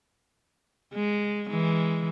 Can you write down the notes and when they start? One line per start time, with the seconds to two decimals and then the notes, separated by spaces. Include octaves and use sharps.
0.94 G#3
1.50 E3 G#3